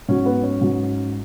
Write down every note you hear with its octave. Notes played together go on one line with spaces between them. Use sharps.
G#2 F#3 C#4
B3
C#4
G#2 F#3